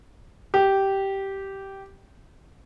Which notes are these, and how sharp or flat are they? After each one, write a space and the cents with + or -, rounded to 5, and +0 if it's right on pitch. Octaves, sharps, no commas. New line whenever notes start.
G4 -10